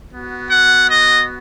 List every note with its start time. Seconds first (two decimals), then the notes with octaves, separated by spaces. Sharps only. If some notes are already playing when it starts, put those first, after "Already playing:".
0.12 B3 F#4
0.51 F#5
0.90 D#5